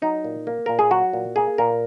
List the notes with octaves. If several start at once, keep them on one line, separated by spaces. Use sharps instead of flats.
F#3 D#4
A#2
A#3
A#2 A#4
G#4
F#3 F#4
A#2
A#3 G#4
A#2 A#4